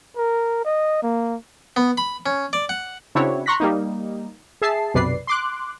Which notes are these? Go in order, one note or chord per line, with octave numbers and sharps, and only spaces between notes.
A#4
D#5
A#3
B3
B5
C#4
D5
F#5
C#3 C4 D4 E4 F#4 C#5
A#5 C6 C#6 F#6 A#6 B6
G3 A#3 D#4
G#4 E5 A5 C7
B1 F#2 C3 B4 D5 C7
C6 D6 F#6